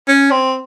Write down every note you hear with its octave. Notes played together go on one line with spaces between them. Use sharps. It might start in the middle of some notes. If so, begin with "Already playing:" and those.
C#4
C4